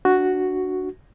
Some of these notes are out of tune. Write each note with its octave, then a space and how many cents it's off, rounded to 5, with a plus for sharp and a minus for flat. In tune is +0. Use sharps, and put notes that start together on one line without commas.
D4 +0 F#4 +0